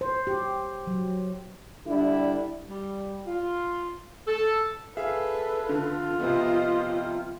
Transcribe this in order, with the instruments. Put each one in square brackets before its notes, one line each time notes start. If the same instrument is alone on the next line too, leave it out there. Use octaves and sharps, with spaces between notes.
[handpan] C5
G4
F#3
[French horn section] D3 G3 D4 E4
[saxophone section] G3
F4
A4
[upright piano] G#4 E5 F5 [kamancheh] A4 B4
[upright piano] D3 [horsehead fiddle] F4
[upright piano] C3 F3 B3 [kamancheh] C5 D#5